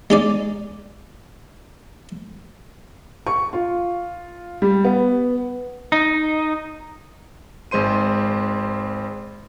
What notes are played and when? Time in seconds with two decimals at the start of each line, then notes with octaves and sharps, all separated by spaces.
0.10 G#3 D#4 D5
3.27 C#6
3.53 F4
4.62 G3
4.85 B3
5.92 D#4
7.71 G#1 G#3 C5 C6 D#7